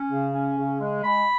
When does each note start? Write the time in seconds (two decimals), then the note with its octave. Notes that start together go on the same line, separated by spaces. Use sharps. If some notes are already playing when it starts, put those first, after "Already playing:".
Already playing: C#4
0.11 C#3
0.33 C#4
0.57 C#3
0.81 G#3
1.04 G#3 B5